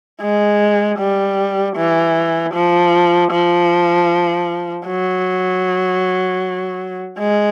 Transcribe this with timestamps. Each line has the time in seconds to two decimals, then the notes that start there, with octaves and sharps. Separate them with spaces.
0.22 G#3
0.99 G3
1.76 E3
2.54 F3
3.32 F3
4.86 F#3
7.19 G#3